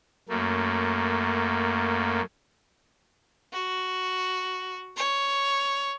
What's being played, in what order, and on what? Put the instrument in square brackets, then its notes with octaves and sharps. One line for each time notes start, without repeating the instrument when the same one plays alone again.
[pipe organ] F#2 A3 A#3
[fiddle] F#4
C#5